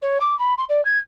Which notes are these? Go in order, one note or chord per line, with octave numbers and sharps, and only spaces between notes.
C#5
D6
B5
C6
D5
G#6